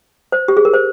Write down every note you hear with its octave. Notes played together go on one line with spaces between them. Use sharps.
C5
G4
G#4
A#4
C5